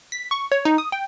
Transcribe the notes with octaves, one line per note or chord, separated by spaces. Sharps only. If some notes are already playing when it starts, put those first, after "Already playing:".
B6
C#6
C#5
D#4
D#6
G5